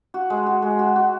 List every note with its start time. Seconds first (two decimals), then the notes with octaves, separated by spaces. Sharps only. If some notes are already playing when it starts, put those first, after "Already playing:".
0.14 F#4
0.30 G#3
0.46 F#4
0.62 G#3
0.79 F#4
0.96 F#4